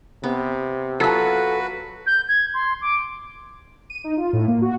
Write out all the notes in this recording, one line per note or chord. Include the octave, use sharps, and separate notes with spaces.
C3 B3
F#3 F4 F#4 A4 B4
G6
G#6
C6
D6
D#7
D#4
F4
A2
A#3
F#4